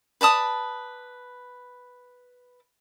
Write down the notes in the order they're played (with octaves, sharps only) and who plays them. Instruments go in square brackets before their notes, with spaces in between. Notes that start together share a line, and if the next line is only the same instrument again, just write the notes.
[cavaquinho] B4 D5 A5 D#6